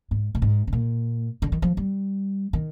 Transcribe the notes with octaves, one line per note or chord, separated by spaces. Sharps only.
G#2
A#2
G#2
C3
A#2
D3
D#3
F3
G3
D#3